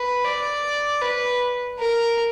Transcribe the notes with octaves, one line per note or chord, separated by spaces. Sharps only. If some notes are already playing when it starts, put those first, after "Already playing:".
Already playing: B4
D5
B4
A#4